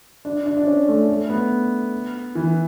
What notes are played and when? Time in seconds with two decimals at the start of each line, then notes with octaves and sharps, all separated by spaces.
0.25 D4
0.46 D4
0.57 D4
0.67 C#4
0.88 A3
1.09 A3
1.29 B3
2.35 E3